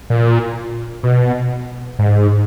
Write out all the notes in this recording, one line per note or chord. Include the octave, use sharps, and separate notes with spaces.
A#2
B2
G#2